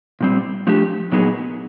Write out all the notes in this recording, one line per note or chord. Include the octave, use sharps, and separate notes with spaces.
A#2 G3 C4
F3 A3 D4 G4
A#2 F#3 B3 D#4 G#4